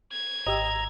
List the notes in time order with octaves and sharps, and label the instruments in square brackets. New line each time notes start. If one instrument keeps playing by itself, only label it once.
[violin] G#6
[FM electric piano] G#1 G4 E6 [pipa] D#5 [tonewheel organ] A#5